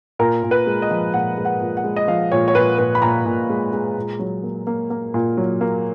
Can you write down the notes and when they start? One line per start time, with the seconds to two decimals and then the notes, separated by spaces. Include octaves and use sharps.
0.19 A#2 A#4
0.43 A#2
0.51 B4
0.67 G#3
0.82 D#5
0.90 F3
1.14 A#2 F#5
1.37 G#3
1.45 F#5
1.61 A#2
1.77 F#5
1.84 G#3
1.96 D#5
2.08 F3 F5
2.32 A#2 C#5
2.48 C#5
2.55 A#2 B4
2.79 A#2 B4
2.95 B5
3.02 A#2 A#5
3.26 A#2
3.49 G#3
3.73 G#3
3.97 A#2
4.19 F#3
4.43 A#3
4.67 A#3
4.90 A#3
5.14 A#2
5.37 F#3
5.61 A#3